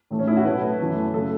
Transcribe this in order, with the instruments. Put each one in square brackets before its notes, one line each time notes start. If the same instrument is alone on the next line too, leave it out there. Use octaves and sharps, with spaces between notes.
[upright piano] A2 E3 A3
C#4
E4
F#4
B2 F#3 A3 B4
F#2 E3 A3
C#3 F#3 A3 A4